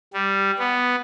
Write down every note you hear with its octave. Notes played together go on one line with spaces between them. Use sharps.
G3
B3